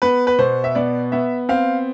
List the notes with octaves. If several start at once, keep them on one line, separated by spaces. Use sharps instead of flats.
B3 B4
B4
B2 C5
E5
B3 D5
B3 E5
C4 F5